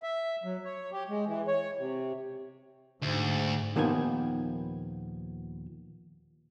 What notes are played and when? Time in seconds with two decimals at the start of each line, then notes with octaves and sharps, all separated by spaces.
0.03 E5
0.44 F#3
0.64 C#5
0.92 G4
1.09 G#3
1.26 E3
1.47 C#5
1.79 C3
3.02 D2 G#2
3.76 D#2 A#2 D#3 F3 B3 G#5